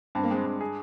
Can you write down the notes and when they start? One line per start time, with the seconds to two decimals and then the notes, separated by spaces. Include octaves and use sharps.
0.15 G2 C4
0.24 A#3
0.31 G#3 C4
0.46 G2
0.61 G#4